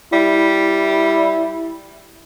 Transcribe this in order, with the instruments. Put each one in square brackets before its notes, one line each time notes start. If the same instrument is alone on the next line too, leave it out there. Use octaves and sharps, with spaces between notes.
[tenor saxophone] G3 [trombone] E4